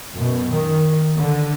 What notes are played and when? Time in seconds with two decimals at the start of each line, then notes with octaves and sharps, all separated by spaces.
0.14 F#2 B2
0.53 D#3
1.19 D3